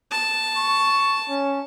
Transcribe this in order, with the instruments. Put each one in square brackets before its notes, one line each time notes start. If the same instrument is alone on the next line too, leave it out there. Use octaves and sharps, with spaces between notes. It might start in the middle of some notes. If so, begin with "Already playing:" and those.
[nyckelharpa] A5
[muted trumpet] C#6
C#4